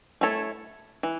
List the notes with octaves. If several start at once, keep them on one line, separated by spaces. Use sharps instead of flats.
A3 E4 A4 C#5
E3